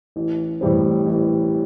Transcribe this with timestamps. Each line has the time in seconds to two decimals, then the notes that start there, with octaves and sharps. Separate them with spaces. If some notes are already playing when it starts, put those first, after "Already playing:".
0.16 A1
0.61 A2 E3 G3 C4
1.06 A1